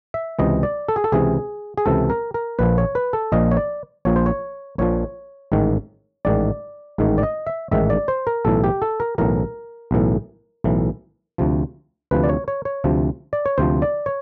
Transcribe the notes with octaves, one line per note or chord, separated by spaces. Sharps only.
E5
C#2 C3 E3 D#5
D5
A4
G#4
A4
C#2 C3 E3 G#4
G#4
C#2 C3 E3 A4
A#4
A#4
A#1 A#2 F3 B4
C#5
B4
A4
A#1 A#2 F3 D#5
C#5
D5
A#1 A#2 F3 C#5
C5
C#5
A#1 A#2 F3 C#5
A1 G#2 D#3
A1 G#2 D#3 D5
A1 G#2 D#3
D5
D#5
E5
A1 G#2 D#3 E5
D5
C5
A#4
B1 A2 E3 A4
G4
A4
A#4
B1 A2 E3 A#4
B1 A2 E3
B1 A2 E3
D2 C3 F3
D2 C3 F3 B4
D5
C#5
C#5
C#5
D2 C3 F3
D5
C#5
D2 C3 F3 C5
D5
C#5